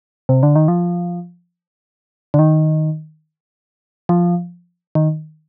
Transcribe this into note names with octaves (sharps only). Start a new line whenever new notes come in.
C3
D3
D#3
F3
D3
D#3
F3
D#3